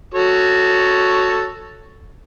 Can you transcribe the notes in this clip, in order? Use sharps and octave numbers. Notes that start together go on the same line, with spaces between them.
F#4 A4 C#5